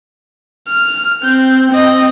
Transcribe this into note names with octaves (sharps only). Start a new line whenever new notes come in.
F6
C4 G6
C4 D#5